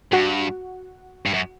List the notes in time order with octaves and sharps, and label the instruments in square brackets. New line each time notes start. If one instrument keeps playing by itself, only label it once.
[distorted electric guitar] G2 [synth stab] F#4 F#5
[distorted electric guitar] G2
F#2